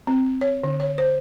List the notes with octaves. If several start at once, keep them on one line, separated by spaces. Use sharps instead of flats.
C4
C#5
D3
C#5
C5